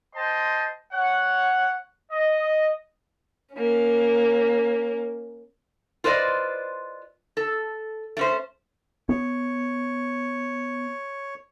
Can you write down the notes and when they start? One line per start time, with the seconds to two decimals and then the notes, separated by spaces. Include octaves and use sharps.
0.15 C5 D#5 G5 A5 C6
0.93 C#5 F#5
2.11 D#5
3.55 A#3 C#4
6.04 F4 B4 C5 D5 D#5
7.37 A4
8.17 A3 C#4 C5
9.09 B3 C#5